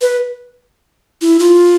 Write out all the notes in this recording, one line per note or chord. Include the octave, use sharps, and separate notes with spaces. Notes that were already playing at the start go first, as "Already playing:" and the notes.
B4
E4
F4